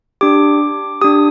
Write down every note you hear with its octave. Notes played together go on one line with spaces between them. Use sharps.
D4 G4 D6
D4 G4 D#6